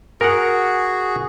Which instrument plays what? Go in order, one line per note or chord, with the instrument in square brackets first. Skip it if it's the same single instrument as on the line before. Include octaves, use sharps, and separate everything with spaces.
[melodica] F#4 G#4 [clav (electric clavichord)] A#4 F#5